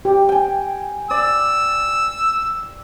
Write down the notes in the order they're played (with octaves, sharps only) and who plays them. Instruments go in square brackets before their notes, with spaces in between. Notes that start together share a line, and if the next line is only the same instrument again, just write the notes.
[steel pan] G4
[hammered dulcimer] G5 G#5
[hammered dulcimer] D5 [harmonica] E6